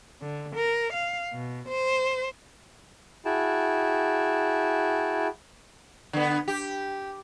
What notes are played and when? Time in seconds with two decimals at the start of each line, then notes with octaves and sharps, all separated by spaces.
0.22 D3
0.56 A#4
0.93 F5
1.34 B2
1.68 C5
3.25 E4 F#4 G#4 G5 A5
6.13 D3 B3
6.48 G4